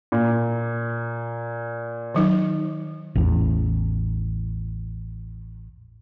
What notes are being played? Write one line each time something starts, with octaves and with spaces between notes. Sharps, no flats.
A#2
D#3 F#3 D#4
A1 E2